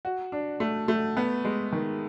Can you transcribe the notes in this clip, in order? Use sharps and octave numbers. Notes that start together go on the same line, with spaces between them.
F#4
D4
A3
A3
B3
G#3
D#3